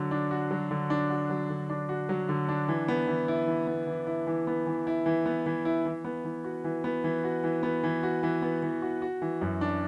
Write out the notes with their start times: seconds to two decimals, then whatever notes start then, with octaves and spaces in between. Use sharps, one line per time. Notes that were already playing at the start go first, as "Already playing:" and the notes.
Already playing: D3 F#3 F#4
0.11 D4
0.31 F#4
0.51 F#3
0.71 D3
0.90 D4
1.10 F#4
1.30 F#3
1.50 D3
1.70 D4
1.89 F#4
2.09 F#3
2.29 D3
2.49 D4
2.68 E3
2.88 B3
3.08 E3
3.28 E4
3.47 E3
3.67 B3
3.87 E3
4.07 E4
4.27 E3
4.47 B3
4.67 E3
4.87 E4
5.06 E3
5.26 B3
5.46 E3
5.65 E4
5.85 E3
6.05 B3
6.25 E3
6.44 F#4
6.64 E3
6.84 B3
7.04 E3
7.24 F#4
7.44 E3
7.63 B3
7.83 E3
8.03 F#4
8.23 E3
8.42 B3
8.63 E3
8.82 F#4
9.02 F#4
9.22 E3
9.41 F#2
9.61 D4